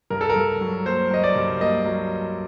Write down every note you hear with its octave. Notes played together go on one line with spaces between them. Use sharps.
G2 A#4
A4
A#4
G2
F#3
A#3 C5
F#3 D#5
D5
G2
A#3 D#5
F#3